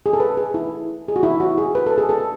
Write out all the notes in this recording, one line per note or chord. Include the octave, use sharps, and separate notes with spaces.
G#4
A4
B4
G#4
E4
G#4
F#4
E4
F#4
G#4
B4
A4
G#4
A4